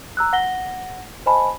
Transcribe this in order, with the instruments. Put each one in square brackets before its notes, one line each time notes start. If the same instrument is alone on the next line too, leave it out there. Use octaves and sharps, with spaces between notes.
[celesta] A#5 E6 F#6
F#5 A#6 G7
C5 D#5 G#5 A5 B5